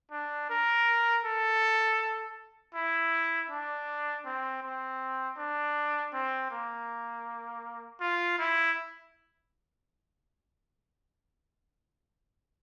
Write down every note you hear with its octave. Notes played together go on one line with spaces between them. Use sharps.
D4
A#4
A4
E4
D4
C4
C4
D4
C4
A#3
F4
E4